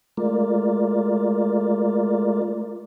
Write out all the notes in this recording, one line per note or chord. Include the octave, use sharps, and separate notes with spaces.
G#3 A3 F4 A#4 D5